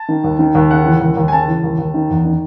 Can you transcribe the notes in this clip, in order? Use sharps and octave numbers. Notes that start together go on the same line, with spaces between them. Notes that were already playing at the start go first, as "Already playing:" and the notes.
Already playing: A5
D#3
D#2
D#3
D#2
C#3 F#5
E3
D#2
D#2
G#5
C#3 A5
E3
D#2
D#2
D#3
E2
D#3